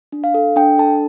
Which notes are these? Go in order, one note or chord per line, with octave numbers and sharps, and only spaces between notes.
D4
F5
A4
D4 G5
A4 A5